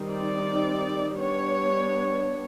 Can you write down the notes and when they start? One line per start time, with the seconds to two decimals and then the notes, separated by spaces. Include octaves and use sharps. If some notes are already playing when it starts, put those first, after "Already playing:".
Already playing: D#3 G3 C4 D#4
0.09 D5
1.17 G3 B3 D4 C#5